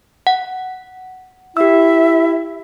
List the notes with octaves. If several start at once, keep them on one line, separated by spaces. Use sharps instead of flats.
F#5
E4 G4 E5 E6